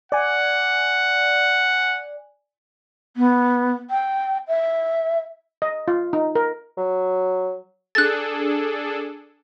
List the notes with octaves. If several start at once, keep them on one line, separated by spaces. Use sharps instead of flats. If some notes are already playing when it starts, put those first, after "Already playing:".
D5 F#5 G#5
B3
G5
E5
D#5
F4
D#4
A#4
F#3
D4 G#4 A4 F#6 A6